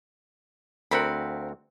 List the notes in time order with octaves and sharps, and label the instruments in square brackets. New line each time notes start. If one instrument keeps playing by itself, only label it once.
[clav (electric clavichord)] D2 C4 F#5 [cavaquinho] A#4 F5 B5